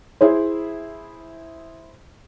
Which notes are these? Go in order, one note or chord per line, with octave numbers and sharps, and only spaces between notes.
E4 G#4 C5